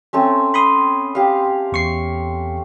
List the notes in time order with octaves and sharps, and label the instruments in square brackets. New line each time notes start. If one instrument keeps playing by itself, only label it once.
[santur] A3 C4 C#4
[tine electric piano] B5 C6 D#6
[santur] G4 F5
[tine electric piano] E2 C#6 C7